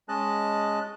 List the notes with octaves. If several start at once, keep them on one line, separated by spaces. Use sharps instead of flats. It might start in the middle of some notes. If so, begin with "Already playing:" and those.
G#3 C#4 D#5 A5 F#6